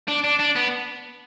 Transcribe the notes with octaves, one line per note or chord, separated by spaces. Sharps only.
D4
D4
D4
B3